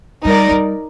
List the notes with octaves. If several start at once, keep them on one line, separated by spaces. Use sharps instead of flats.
G3 D#4 A#4 D5
G3